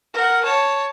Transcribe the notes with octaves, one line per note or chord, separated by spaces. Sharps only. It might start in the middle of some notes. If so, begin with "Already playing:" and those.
A#4 F#5
C#5 A5